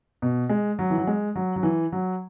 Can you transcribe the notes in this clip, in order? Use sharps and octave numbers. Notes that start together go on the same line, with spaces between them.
B2
G#3
F#3
E3
F#3
G#3
F#3
F#3
E3
F#3